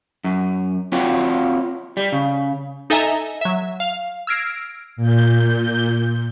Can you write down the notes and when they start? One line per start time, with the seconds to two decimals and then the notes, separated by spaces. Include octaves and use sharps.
0.24 F#2
0.92 C4 F4 F#4 C#5 G5
1.97 G3
2.12 C#3
2.90 D#4 A4 D#5 E5 G#5 A#5
3.41 F#3 E5
3.80 F5
4.27 E6 F6 G#6 A#6 C7 D7
4.96 A#2 G6